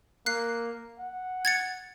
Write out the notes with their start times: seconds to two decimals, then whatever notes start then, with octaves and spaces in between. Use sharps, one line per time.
0.26 A#3 F#6 C7
0.99 F#5
1.45 G#6 A6 C#7